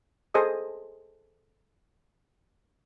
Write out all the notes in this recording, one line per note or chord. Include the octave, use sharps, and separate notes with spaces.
G#4 A4 C5 D#5 D#6